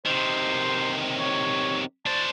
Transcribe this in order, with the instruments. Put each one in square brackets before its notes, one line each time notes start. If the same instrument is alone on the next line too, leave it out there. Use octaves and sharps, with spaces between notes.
[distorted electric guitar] C3 D#3 [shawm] C5
[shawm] C#5
[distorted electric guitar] D4 C5 [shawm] A5